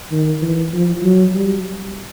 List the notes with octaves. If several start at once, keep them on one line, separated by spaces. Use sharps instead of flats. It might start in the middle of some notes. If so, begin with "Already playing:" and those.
D#3
E3
F3
F#3
G3